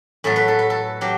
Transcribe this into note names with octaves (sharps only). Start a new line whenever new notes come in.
A2 F#3 A4
B4
A4
B4
A4
F#3 G4